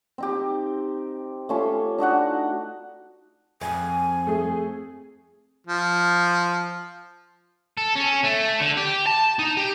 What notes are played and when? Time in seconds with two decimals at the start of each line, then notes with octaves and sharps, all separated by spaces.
0.18 C4 D#4 G4
1.49 A3 C#4 F4
1.98 D4 D#4 F#4 F#5
3.61 F2 G#5
4.27 A3 G#4
5.67 F3
7.77 A4
7.96 C#4
8.24 A3
8.60 D3
8.77 G4
9.07 A5
9.39 D#4
9.57 G4